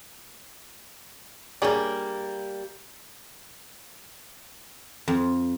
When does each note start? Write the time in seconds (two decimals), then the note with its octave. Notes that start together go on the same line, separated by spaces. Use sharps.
1.62 G3 A#3 D4 G#4 C#5
5.08 F2